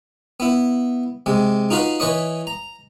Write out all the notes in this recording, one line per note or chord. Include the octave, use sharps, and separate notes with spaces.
B3 E4
C3 G#3
D#4 F4 F#4 B4 F5
E3 B4 C#5 D#5
A#5